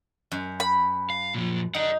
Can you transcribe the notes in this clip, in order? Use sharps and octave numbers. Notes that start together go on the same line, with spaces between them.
F#2
B5
F5
A#2 F3
D#4 D5 F#5